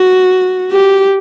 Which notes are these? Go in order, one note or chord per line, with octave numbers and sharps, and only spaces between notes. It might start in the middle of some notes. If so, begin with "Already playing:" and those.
Already playing: F#4
G4